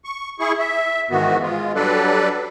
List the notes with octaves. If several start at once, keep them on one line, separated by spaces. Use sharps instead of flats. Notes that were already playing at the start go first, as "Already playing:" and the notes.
C#6
E4 G#4 C#6
E5
G#2 D#3 E3 B3 F#4
G#3 F4
F#3 G3 D4 A4 B4 D5